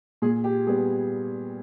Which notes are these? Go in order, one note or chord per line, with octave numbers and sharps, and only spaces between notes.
A#2 G#4
G4
G3 B3 G#4